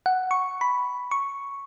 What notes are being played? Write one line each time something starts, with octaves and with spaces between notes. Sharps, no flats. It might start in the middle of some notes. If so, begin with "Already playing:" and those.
F#5
C#6
B5
C#6